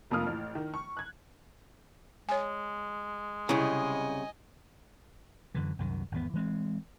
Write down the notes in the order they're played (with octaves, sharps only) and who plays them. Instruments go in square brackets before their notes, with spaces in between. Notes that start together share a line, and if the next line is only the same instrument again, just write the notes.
[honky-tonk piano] F1 F2 A#3 F4 D#6 F6
A1
D#3
C#6
F#6 G#6
[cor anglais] G#3 [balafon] C#5 G#5
[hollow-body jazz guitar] C2 C#3 [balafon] E4 [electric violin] D#5 G#5
[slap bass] F#2 D3 E3
C2 F#2 D#3
G#1 E2 B3
E3 G#3 C4